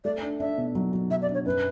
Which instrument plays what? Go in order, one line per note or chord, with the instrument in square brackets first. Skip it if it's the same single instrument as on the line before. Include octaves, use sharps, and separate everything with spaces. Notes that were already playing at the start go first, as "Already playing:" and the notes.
[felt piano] A3 [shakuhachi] D5
[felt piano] D4
[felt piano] D4 [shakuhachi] E5
[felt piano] B2
F#3
F#3
[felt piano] B2 [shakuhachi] E5
[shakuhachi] D5
[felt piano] D4
[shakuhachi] C#5
[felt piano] F#2 [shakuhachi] B4